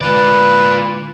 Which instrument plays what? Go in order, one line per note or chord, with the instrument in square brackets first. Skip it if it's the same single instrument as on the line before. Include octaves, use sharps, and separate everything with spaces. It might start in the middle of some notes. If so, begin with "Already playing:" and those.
[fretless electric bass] D3 G#3 [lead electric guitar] F4 D5 [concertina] B4